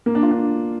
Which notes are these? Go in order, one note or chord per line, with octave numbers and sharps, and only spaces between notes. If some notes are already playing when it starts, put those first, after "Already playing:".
A#3
D4
F4
D4